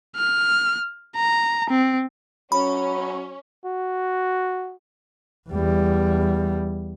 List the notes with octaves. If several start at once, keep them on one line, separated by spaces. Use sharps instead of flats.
F6
A#5
C4
F#3 C#4 B5
F#4
E2 G3